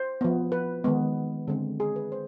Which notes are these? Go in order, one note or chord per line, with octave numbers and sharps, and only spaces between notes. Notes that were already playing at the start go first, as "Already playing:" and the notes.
Already playing: C5
F3 B3
B4
D#3 G#3 B3
D3 G#3 C4
G#4
B4
C5